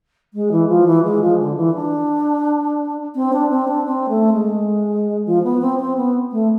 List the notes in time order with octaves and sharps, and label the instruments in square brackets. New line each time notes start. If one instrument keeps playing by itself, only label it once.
[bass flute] G#3
E3
F3
E3
G#3
F3
D3
E3
D4
C4
D4
C4
D4
C4
A3
G#3
F3
B3
C4
C4
B3
A3